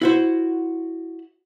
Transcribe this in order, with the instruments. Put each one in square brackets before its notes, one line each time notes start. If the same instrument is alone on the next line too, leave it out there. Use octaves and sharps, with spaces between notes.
[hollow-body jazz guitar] E4 F#4 C5